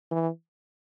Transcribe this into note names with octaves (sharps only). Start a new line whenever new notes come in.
E3